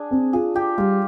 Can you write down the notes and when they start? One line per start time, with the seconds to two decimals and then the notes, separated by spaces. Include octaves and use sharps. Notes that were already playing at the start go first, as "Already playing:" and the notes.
Already playing: D4 G#4
0.11 C4
0.33 F4 G#4
0.55 F4 G4
0.78 G3 F4